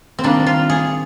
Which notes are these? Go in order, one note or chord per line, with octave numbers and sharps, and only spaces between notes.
C4
D#3 G3 A#3 D4
F4
G#4